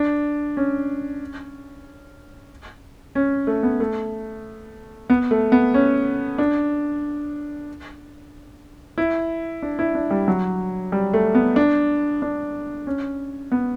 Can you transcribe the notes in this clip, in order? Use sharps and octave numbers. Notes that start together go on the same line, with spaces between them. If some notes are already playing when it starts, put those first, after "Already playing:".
Already playing: D4
C#4
C#4
A3
B3
A3
B3
A3
B3
C#4
D4
E4
D4
E4
D4
G3
F#3
G3
A3
B3
D4
D4
C#4
B3